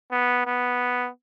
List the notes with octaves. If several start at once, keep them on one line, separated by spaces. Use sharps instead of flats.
B3
B3